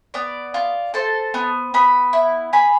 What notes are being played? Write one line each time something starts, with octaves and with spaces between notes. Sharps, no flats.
B3 D5
F4
A4 C5
B3
B3 B5
E4
G#4 B5